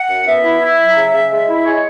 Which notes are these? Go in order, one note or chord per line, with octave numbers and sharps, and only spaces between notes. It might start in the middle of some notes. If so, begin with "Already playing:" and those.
Already playing: F#5
F#2
B3 E5
E4
E4
F#3
C#3
C#3
G#3
E4
G#3 C#5